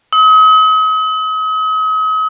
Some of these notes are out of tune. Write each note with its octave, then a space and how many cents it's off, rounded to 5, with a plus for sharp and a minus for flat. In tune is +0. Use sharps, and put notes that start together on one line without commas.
D#6 +40